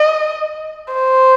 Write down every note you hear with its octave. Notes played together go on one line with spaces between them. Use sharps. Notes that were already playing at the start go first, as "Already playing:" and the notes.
Already playing: D#5
C5